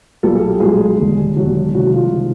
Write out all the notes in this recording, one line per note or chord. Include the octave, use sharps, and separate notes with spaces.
B1 A#2 G3 A4
G#4
G4
B1 A#2 G3 G#3 G#4
E1 D#2 D3 G3
E1 D#2 D3 F#3 G3 F#4
C2 C3 D#3 F#3 G#3 F#4
F3 F4
C3 D#3 G#3